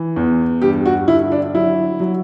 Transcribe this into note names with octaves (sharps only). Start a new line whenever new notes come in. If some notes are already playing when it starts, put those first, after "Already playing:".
Already playing: E3
E2
G2 G4
F#4
D3 E4
D4
F#3 E4
F#3